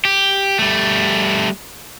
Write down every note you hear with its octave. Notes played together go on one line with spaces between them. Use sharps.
G4
G3 A3